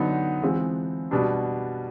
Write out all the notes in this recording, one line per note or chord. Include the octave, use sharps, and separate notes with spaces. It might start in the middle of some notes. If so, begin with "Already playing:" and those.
Already playing: D3 F#3 B3 D#4
E3 G#3 C4 F4
B2 G3 B3 D4